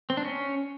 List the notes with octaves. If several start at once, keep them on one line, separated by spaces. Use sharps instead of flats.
C4
D4
C#4